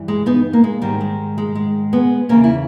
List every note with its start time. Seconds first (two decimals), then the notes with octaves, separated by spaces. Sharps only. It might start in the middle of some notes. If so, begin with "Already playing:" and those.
Already playing: G2 E3
0.08 G#3
0.26 B3 D#4
0.53 A#3
0.64 G#3
0.82 G#2 D#3 G3
1.00 G#3
1.38 G#3
1.55 G#3
1.93 G#3 B3
2.29 E2 C#3 E3 A#3 C#4
2.44 E4